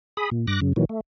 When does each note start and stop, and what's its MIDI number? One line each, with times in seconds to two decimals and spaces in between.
0.17 0.30 68
0.17 0.30 83
0.17 0.30 87
0.31 0.46 46
0.47 0.60 43
0.47 0.60 86
0.47 0.60 90
0.47 0.60 94
0.61 0.73 42
0.61 0.73 49
0.76 0.85 46
0.76 0.85 51
0.76 0.85 52
0.76 0.85 54
0.89 1.01 57